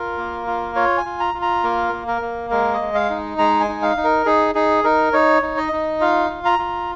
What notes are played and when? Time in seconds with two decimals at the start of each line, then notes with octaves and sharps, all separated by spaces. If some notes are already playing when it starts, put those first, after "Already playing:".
Already playing: F4 A#4
0.18 A#3
0.47 F4
0.75 F4 C#5
0.98 G#5
1.05 F4
1.20 A#5
1.34 F4
1.42 A#5
1.63 A#3 A#4
1.93 A#3
2.08 A#4
2.22 A#3
2.51 G#3 A#4
2.73 D#5
2.81 G#3
2.95 F5
3.10 D#4
3.38 G#3 A#5
3.60 G#5
3.68 D#4
3.82 F5
3.97 D#4
4.04 A#4
4.25 D#4 G#4
4.55 D#4 G#4
4.84 D#4 A#4
5.13 D#4 C#5
5.42 D#4
5.57 D#5
5.73 D#4
6.01 F4 F5
6.30 F4
6.45 A#5
6.59 F4